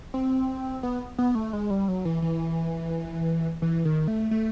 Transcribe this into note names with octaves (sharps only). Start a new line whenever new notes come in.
C4
B3
B3
A3
G#3
G3
F#3
E3
E3
E3
D#3
A3
A3